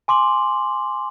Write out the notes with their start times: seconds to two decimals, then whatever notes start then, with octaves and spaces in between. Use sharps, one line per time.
0.08 G#5 C6 D6 F#7